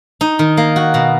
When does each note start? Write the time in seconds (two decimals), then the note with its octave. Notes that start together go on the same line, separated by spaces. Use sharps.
0.21 D#4
0.39 D#3
0.57 A#3
0.76 F#4
0.94 B2